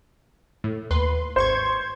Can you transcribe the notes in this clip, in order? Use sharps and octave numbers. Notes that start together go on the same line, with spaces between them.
A2
D#2 B4 C6
G#1 C5 C#6 G#6